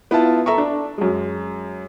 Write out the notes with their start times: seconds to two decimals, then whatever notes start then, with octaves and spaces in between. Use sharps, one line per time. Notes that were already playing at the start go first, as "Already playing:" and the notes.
0.11 B3 E4 F4 A5
0.46 A4 E5 A#5 C#6
0.58 D4
0.98 F#2 G#3